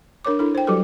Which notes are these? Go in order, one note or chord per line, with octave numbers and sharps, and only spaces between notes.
D4 A#4 C#5 D6
D4 E4 A4
C5 G5
F#3 G3 F#4 G4 A4 B4